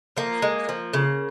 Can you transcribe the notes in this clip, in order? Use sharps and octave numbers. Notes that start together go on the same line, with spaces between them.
F3 A#3
G#3
F3
C#3